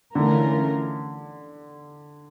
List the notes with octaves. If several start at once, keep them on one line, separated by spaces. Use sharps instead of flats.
D3 E3 A3 C#4 F4 A#4